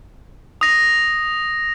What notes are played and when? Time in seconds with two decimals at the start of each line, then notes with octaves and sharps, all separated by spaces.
0.61 D#6 A#6